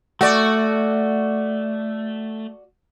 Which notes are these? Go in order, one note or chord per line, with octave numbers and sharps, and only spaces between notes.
A3 F#4 D5